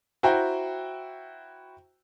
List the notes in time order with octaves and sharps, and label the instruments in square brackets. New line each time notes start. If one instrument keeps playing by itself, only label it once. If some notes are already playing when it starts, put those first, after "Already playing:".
[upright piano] E4 F#4 C5 G5 A#5